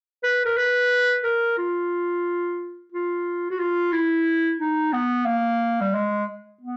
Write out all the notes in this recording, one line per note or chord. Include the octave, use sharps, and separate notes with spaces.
B4
A#4
B4
A#4
F4
F4
F#4
F4
E4
D#4
B3
A#3
G3
G#3
B3